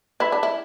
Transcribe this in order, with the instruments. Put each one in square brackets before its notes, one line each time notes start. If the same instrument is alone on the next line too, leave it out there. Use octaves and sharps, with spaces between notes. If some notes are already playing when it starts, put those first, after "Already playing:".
[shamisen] E4 [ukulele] B4 E5 B5
[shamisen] D4
E4